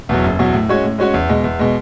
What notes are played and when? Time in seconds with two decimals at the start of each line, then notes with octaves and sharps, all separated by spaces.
0.09 E2 B2 F#3
0.24 F#1
0.39 E2 B2 F#3
0.54 A2
0.69 G#3 C#4 F#4 C#5
0.84 A2
0.98 G#3 C#4 F#4 C#5
1.14 E2
1.29 B2 G#3
1.44 E2
1.59 B2 G#3